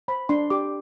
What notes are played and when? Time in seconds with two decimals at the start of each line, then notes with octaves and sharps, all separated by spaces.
0.08 C5 B5
0.29 D4 C6
0.50 G4 D6